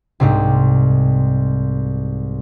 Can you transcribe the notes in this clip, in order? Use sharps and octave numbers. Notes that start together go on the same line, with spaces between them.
C2 G#2 C3